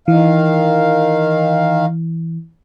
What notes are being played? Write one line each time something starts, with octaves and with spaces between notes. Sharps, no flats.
D#3 E3 F5